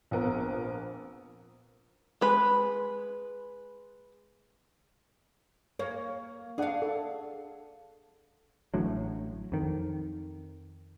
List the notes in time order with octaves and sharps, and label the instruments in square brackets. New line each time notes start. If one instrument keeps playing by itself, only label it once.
[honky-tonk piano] A#1 F2 B3 A#4
[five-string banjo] G#3 B4
[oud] A#3 [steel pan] C#5
[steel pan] D4 D5 F#5 [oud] G#4 F5
[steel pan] A4
[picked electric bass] A1 A2 D3 F#3
F2 D#3